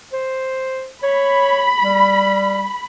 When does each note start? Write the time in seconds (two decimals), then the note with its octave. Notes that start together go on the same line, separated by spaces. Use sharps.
0.13 C5
1.03 C#5 B5
1.84 G3